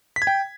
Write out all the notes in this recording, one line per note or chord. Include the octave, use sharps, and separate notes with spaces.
B6
G#6
G5